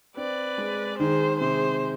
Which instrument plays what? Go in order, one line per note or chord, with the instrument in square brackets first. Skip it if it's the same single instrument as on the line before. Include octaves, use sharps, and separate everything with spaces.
[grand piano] C4 [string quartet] B4 D5
[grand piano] G#3
[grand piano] D#3 [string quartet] G#4 C5
[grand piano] C3 [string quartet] G#4 C5